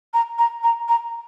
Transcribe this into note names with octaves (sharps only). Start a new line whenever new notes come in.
A#5
A#5
A#5
A#5